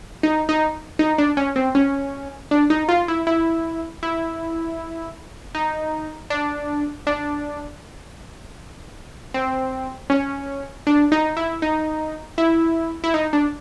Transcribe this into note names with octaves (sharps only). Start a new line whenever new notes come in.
D#4
D#4
D#4
D4
C#4
C4
C#4
D4
D#4
F4
E4
E4
E4
D#4
D4
D4
C4
C#4
D4
D#4
E4
D#4
E4
E4
D#4
D4